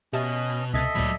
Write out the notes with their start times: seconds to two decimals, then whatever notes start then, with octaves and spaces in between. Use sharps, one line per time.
0.13 B2 C#4 G4 D#5 E5 A5
0.73 C#2 A4 D#5 E5 G#6 A6
0.95 D2 A#2 F#3 D5 B5